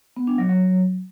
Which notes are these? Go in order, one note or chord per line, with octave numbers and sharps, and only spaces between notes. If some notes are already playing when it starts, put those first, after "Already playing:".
B3
D4
F#3
F#3